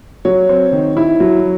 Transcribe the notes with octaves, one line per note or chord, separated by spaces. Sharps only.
F#3 C#5
C4
D#3
E4
F#3